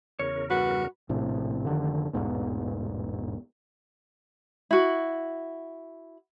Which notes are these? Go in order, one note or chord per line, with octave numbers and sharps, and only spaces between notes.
E2 C#3 A#4 C#5
G2 F#4 B4
A#1 A2 C3
F1 D3 D#3
A1 E2 G#2 B2
E4 F#4